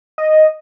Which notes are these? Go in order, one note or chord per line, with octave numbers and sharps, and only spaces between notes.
D#5